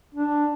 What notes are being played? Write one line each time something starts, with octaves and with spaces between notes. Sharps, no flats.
D4